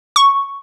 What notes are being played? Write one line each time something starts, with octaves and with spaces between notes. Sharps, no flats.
C#6